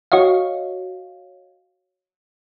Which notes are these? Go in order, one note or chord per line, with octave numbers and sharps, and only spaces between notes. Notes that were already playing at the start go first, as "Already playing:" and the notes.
F#4 C#5 D#5 F5